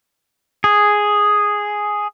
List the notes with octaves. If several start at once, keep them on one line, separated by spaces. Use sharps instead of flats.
G#4